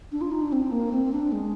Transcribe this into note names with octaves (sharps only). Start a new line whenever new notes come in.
D4
F4
D#4
D4
C4
A#3
C4
D4
G#3